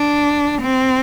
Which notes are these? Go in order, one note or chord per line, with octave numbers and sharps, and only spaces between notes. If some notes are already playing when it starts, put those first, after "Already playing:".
Already playing: D4
C4